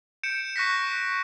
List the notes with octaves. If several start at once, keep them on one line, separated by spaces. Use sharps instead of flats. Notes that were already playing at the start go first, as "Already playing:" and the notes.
G6 C#7 D7 E7
C#6 F#6 A#6 B6